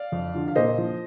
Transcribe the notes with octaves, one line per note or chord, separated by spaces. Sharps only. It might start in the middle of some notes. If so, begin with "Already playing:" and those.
Already playing: D5 F5
F2
D3 F3
F5
A#2 C5 D#5
F3